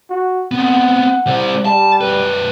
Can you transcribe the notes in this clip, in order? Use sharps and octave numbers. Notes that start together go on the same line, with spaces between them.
F#4
B3 C4 F#5
G3 C5
G3 A5
F#2 B4